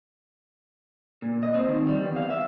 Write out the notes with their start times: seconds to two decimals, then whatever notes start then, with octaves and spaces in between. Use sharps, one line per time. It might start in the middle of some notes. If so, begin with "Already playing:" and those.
1.22 A#2
1.43 D#5
1.54 C4
1.68 D#3
1.87 G3
2.03 E2
2.16 F5
2.30 E5